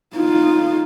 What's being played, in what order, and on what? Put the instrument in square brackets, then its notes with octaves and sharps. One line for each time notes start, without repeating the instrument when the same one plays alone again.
[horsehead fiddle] D#4 F4